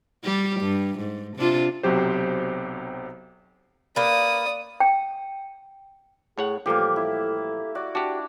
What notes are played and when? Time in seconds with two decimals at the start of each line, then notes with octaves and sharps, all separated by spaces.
0.24 G3 G4
0.61 G2
0.99 G#2
1.37 C3 D4 F4
1.83 B1 C3 F#3 G4 C5
3.96 A#3 B4 D5 D#6
4.80 G5
6.38 A2 G#4 C#5 F#5
6.66 A1 F3 G3 A#3 G4 A4
6.96 E4
7.75 F#4 D5
7.95 D4 F#4 G4